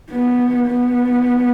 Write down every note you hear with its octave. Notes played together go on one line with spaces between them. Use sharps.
B3
B3